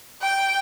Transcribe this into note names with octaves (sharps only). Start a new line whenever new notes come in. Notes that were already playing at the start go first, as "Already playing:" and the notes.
G5